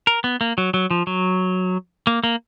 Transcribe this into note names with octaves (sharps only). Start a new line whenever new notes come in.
A#4
B3
A#3
F#3
F#3
F3
F#3
A#3
A#3